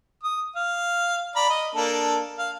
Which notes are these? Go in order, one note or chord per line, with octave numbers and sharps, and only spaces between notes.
D#6
F5
D5 A#5 B5
D#5
A#3 D4 A4
F5